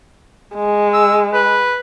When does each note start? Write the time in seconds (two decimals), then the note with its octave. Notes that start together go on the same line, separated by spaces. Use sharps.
0.55 G#3
0.94 E6
1.33 B4